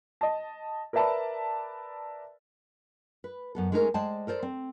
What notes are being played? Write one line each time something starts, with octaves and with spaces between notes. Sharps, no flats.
D#5 A5
A#4 B4 D5 E5 A5 B5
B4
F#2 B3 A4
G#3 A3 C#4 D#4 G4 A#4
G#3 C5 D5 G5 A5
A4 A#4 C5 D5
C4